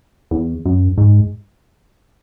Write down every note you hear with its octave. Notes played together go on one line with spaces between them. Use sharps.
E2
F#2
G#2